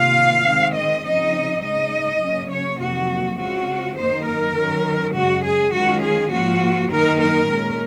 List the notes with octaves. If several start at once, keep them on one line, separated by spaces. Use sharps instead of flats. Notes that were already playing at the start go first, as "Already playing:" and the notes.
Already playing: C3 D#3 A#3 F4 F5
D#3 G#3 C4
D#5
C#3 F3 C4 D#4 D#5
C#3 G#3 D#4 D#5
C#3 F#3 A#3 C#4
C#5
F2 C3 D#3 F#3 A#3 F#4
C#3 G#3 C4 F4 F#4
F#2 D#3 A#3 D#4 C5
A#4
D#3 F#3 C#4
F#2 C#3 G#3 F#4
G#4
D#3 G#3 C#4 F4 F#4
G#4
G#2 F3 A#3 F4 F#4
F#2 D#3 A#3 D#4 A#4
A#4
A#2 G#3 C#4